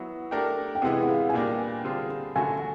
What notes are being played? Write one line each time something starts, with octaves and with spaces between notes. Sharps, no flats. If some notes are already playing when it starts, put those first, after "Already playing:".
Already playing: F#3 B3 E4
A3 D4 G4 A#4
G5
C3 E3 G#3 B3 E4 F#5
F#5
F5
G#5
A#2 G3 A#3 D4 G4 G5
D3 G3 C4 F4 G#4
D3 F#3 A3 C#4 F#4 G#5